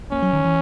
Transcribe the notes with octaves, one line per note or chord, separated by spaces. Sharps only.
A#3 C#4
F#3
D#3
E3